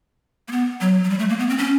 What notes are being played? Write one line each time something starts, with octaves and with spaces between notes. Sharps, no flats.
A#3
B3
F#3
F#3
G3
A3
A#3
B3
C4
C#4